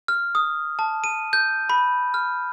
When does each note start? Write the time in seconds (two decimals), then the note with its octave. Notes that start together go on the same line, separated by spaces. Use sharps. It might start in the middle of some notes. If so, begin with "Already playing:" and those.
0.08 F6
0.35 D#6
0.79 A5
1.04 D#7
1.33 G6
1.69 B5
2.14 F6